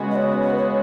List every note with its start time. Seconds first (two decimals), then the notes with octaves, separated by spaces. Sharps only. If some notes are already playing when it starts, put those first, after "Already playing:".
Already playing: C#3 G#3 B3 F#4
0.11 D#5
0.15 C#5
0.42 C#5
0.50 B4
0.57 C#5